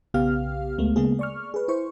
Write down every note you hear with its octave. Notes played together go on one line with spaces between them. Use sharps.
B1 C#3 B3 G4 F5 F6
D2 G#3 A3 B3
C#3 G#3 A#3 B3 G#4
D5 C#6 F6
G#4 B4
E4 C5 C#6